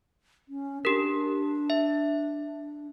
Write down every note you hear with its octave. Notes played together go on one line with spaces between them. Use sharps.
C#4
D4 G4 A#4
E5